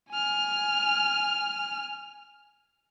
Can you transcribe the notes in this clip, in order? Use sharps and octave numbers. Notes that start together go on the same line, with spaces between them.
G#5 F6